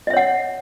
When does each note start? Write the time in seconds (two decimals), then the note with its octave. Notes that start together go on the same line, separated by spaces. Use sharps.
0.07 D#5
0.10 E5
0.13 C#5
0.17 F#5